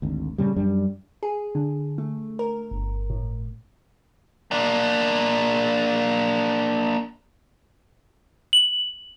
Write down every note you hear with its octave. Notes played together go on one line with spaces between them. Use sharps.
G#1 D2
A2 C#3 G3
F#2 G3 D4
G#4
D3
A3
A#4
G1
A2
A#3 D4
F#7